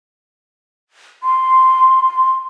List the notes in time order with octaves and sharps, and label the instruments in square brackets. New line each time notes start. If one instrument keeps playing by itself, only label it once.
[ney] C6